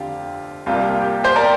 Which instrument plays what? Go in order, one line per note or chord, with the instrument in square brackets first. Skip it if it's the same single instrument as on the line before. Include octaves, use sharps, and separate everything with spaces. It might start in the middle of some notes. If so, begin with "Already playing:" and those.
Already playing: [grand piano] F1 D3 F4 G4
C2 C3 G3 A#3 F4
G4
G4 C5
A#4 D5